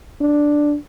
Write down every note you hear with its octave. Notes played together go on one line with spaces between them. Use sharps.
D4